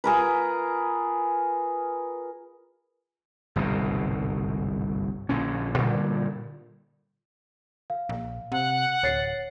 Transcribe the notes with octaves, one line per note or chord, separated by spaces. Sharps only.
F4 G#4 A#4 B4
G1 C2 G#2 B2
A#1 A#2 D3 C#4
G2 A#2 D3 G3
F5
A#1
C3 F#5
D1 C#5 A6 C7